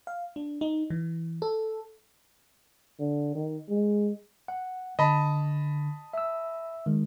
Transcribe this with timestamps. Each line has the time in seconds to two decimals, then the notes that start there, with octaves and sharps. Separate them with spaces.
0.07 F5
0.36 D4
0.61 D#4
0.90 E3
1.42 A4
3.00 D3
3.35 D#3
3.69 G#3
4.48 F#5
4.99 D3 D#5 A5 B5
6.13 E5 E6
6.86 D#3 G#3